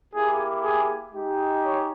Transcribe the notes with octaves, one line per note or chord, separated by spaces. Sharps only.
A#3 E4 G4 G#4
G#4
G#3 D#4 G4
C#5